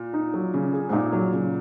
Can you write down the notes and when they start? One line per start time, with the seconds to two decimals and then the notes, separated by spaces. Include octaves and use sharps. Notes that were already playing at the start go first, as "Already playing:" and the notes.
Already playing: A#2
0.13 D#4
0.34 F#3
0.54 C#3
0.73 G#4
0.89 G#2
0.93 A#2 D#4
1.13 F#3
1.33 C#3